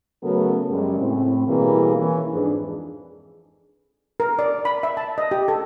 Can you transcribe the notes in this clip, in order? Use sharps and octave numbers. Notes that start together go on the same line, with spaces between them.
C#3 F#3 A3 B3 A4 A#4
F#2 C#3 G3 G#3
A2 C4
B2 E3 G3 A#3 C4 G#4
E3 C#4
F2 G#2 D4 G#4 B4
A#4
D5
B5
E5
A5
D#5
G4
A4